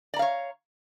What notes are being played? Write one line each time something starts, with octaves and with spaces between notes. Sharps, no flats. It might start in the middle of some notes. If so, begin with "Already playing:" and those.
C#5 D5 F5 A#5